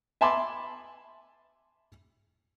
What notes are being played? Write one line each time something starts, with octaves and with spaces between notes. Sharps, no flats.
E5 G#5 A5 B5 C6 D6